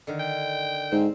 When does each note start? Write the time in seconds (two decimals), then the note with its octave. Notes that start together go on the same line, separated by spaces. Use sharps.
0.07 D3 D#3
0.20 G5
0.92 G#2 C4